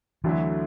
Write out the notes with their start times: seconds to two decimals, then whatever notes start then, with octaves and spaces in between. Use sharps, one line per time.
0.24 D2 D3 E3 F#3 A3 E4